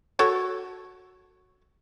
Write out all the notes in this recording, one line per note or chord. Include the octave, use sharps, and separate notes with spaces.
F#4 A4 C#5